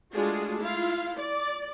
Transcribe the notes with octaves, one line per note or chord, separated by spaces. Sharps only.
G#3 A3 D4 F4 F#4 G#4
E4 F4 F5
D5